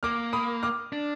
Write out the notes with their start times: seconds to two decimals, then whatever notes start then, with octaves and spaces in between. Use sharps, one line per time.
0.03 A#3 D6 F6
0.33 B5 D#6
0.63 D6 F6
0.92 D4